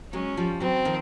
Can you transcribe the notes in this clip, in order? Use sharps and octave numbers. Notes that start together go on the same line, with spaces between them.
F#3 G#3 C#4
F3 G3
E3 F#3 C4
D#3 F3